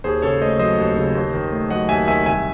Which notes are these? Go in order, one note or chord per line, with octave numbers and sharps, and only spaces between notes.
D#2 G#4 C5
C#3 A4 C#5
A3 C5 D#5
F#3 C5 D#5
D#2
C#3
D#2
D#3
A3
F#3 D#5 F#5
D#2 E5 G#5
D#3 E5 G#5
C2 E5 G#5